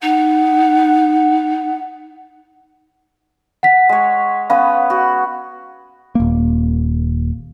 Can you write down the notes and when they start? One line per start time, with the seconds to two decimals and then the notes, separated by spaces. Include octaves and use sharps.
0.02 D#4 F#5
3.63 F#5 B6
3.89 G#3 C#5
4.50 B3 C#4 B4 F5
4.90 F#4
6.15 D#1 A#3